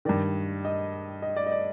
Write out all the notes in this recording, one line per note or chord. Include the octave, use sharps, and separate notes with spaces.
G2 D#3 D5
D#5
D#5
D5
D#5
D5